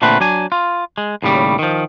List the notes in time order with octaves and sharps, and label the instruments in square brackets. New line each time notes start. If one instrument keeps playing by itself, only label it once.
[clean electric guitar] A#2 D3 A3 C4 B4
F#3 D4 G#5
F4
G#3
D#2 A2 C#3 G3
D#3 F3